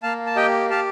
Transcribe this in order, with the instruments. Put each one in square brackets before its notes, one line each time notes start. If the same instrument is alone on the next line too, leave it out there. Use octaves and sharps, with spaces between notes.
[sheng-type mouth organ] A#3 F5 A5
A5
G4 D#5 G5
G4 F5 A5